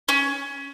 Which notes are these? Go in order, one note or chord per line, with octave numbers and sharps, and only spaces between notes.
C#4